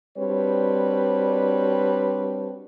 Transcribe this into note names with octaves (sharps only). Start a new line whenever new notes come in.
G3 C4 D4 F#4 B4 C#5